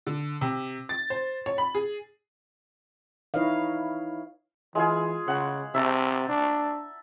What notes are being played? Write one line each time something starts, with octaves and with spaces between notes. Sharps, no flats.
D3
C3
A6
C5
C#5
B5
G#4
D#4 E4 B4 C#5 D#5 F5
E3 G#3 F4 G#4
C#3 F#5
C3 E5 A5 A#5
D4